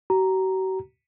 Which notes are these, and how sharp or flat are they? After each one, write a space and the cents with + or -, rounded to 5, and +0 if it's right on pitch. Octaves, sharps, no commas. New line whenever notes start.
F#4 +45 A#5 +0